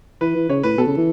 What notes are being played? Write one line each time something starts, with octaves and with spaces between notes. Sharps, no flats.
E3 B4
E3
C#3 C#5
A2 B4
B2 A4
C#3
E3